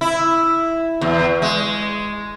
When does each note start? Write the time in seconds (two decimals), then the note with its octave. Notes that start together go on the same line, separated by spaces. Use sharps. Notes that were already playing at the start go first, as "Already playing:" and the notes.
0.01 E4
1.01 E2
1.42 G#3